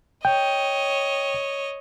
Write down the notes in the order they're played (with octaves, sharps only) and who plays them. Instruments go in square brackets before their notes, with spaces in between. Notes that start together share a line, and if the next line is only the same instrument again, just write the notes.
[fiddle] C#5 D#5 [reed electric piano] G5